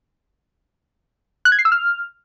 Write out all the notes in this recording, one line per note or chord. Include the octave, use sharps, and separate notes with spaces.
F#6
G#6
C7
E6
F6